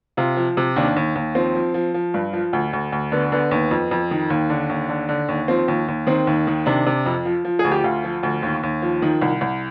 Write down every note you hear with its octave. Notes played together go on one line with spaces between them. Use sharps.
C3 F4
F3
C3
D#2 D4
D#2
D#2
F3 C4
F3
F3
F3
G2
F3
D2
D2
D2
D3 B3
D3 B3
D#2
F2
F2
D#3
D#2
D3
D#2
D3
D3
D#2
F3 C4
D#2
D#2
D#3 C4
D#2
D#3
C3 D4
C3
F2
F3
F3
G#4
D2
G4
D2 F4
F3
D2
D#2
D#2
F3
D#3
C2
C2